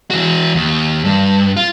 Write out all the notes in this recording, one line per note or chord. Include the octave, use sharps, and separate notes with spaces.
E3 F#4
D#2
G2
F4